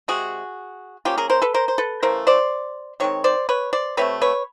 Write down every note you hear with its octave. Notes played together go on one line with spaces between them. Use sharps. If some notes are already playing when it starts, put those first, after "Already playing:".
C3 F3 G#3 F#4 G#4
F3 A#3 C#4 F4 G4
G#4 A#4
A#4 C5
A4 B4
A#4 C5
C5
A4 B4
C#3 E3 A3 A#4 C5
C5 D5
D#3 G#3 C4 C#5
C5 D5
B4 C#5
C5 D5
C3 F3 A3 C4 B4 C#5
B4 C#5